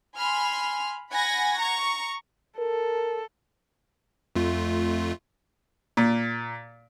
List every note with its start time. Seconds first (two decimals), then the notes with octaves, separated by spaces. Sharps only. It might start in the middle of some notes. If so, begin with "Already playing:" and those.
0.17 G#5 B5 C6 F6
1.12 F#5 G#5 B5 G#6 A#6
1.58 A#5 C#6
2.59 A4 A#4
4.36 F2 A3 F4
5.97 A#2